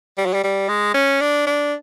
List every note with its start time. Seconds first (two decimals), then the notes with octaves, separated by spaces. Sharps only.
0.18 G3
0.26 F#3
0.34 G3
0.44 G3
0.69 G#3
0.95 C#4
1.21 D4
1.47 D4